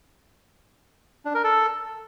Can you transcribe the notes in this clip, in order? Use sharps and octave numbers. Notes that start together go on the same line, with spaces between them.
D4
A#4
A4